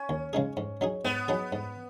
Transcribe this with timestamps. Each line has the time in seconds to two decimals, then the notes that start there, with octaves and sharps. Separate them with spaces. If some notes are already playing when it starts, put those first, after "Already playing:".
Already playing: C#4
0.09 D#2
0.33 C#3 G#3 D#4 G#4
0.57 G#2
0.81 F#3 D#4 G#4
1.04 G#2 B3
1.28 F#3 D#4 G#4
1.52 G#2